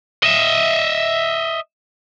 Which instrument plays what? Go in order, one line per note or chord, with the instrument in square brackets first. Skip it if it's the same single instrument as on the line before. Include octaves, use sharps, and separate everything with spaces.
[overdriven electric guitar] D#5 E5